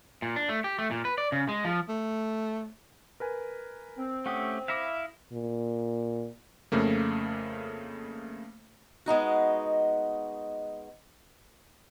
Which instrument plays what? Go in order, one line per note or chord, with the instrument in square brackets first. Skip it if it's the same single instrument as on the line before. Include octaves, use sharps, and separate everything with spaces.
[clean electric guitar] A#2
D4
A3
G4
A3
A#2
B4
D5
C#3
G#3
F3
[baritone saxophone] A3
[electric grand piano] A#4 B4 G#5
[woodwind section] C4
[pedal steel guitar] A3 C#4 G4 [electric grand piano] F#5 D#6
[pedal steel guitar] E4 E5 F5 [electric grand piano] D6 A#6 B6
[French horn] A#2
[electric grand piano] F2 C#3 A3 A#3
[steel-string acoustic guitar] G#3 B3 D#4 F#4